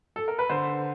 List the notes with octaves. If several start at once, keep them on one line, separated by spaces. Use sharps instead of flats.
A4
A#4
B4
D3 C5